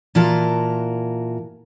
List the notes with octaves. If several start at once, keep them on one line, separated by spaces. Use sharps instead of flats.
A#2 E3 F4 F#4 A#4 A5